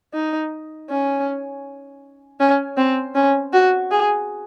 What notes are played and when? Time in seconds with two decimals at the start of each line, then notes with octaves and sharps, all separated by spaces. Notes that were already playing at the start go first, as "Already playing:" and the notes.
0.14 D#4
0.90 C#4
2.40 C#4
2.77 C4
3.15 C#4
3.53 F#4
3.91 G#4